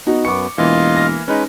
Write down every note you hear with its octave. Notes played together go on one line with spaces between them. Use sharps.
B3 D#4 F#4
F#2 B3 C#6 D6 C#7
E1 E3 A#3 F4 D#5 F5
F6 A#6
G#3 C#4 D#4 B4